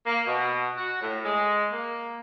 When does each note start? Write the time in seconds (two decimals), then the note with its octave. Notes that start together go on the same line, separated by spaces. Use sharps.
0.06 A#3
0.26 B2
0.77 F#4
1.01 A2
1.25 G#3
1.73 A#3